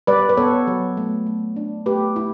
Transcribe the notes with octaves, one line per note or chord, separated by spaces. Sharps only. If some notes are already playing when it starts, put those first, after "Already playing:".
G3 B4 D5
B4
B3 A4 C#5
F#3
A3
A3
D4
A3 G4 B4
E4